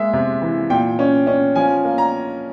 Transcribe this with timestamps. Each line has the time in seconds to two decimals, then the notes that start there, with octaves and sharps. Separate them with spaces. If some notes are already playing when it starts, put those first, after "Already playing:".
Already playing: G#3 A#3 E5
0.13 C3
0.41 E3
0.70 A#2 G5
0.99 C#4
1.27 C#4
1.56 F3 G#5
1.85 A#3
1.98 A#5